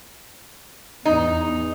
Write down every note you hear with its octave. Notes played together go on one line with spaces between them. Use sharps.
E2 D#4